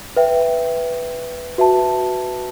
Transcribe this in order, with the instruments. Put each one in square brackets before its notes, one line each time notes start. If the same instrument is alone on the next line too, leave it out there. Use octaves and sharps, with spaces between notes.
[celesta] B4 E5 G5
F#4 B4 E5 A5